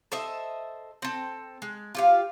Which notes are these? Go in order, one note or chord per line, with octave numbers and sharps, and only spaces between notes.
A4 C5 D#5 E5
C4 A4
G#3
F4 G4 F5